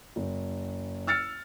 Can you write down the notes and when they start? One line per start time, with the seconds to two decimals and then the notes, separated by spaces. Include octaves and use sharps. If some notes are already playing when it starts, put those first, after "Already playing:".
0.16 F#1
1.07 E6 F6 A6 C#7